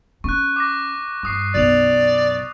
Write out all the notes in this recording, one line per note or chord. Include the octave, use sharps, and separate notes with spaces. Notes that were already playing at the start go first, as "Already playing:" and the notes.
C#4 C#6 F#6
D6 A#6
G2 C#6 D#6 C7
B1 F#2 D5 D#6 F7